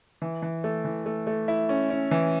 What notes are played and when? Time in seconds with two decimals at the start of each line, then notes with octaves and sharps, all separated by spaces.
0.22 E3
0.42 E3
0.64 A3
0.85 E3
1.06 A3
1.27 A3
1.48 E4
1.69 C#4
1.90 C#4
2.11 E3